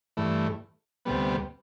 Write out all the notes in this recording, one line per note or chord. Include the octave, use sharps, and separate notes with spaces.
G2 E3 A3
D2 C3 G3 B3